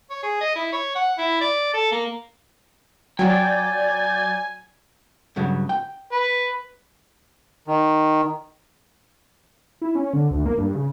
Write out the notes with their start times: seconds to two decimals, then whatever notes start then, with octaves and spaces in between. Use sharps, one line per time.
0.10 C#5
0.23 G#4
0.41 D#5
0.56 E4
0.72 C#5
0.95 F#5
1.18 E4
1.41 D5
1.74 A4
1.92 A#3
3.19 F#3 D5 G5 G#5 G6 A6
5.36 G2 C#3 F#3
5.69 G5
6.13 B4
7.67 D#3
9.81 E4
9.95 C#4
10.13 D3
10.31 D2
10.46 A#3
10.58 G2
10.75 C#3